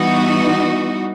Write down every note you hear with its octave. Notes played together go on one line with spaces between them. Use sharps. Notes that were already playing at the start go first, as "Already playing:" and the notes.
Already playing: E3 G3 B3 D#4 F#4